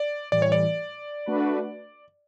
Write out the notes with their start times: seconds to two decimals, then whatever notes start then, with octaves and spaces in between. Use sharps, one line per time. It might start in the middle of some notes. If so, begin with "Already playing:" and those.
Already playing: D5
0.32 A2 E3 G3 D5
0.42 C#5
0.52 D5
1.26 A3 D4 F#4 B4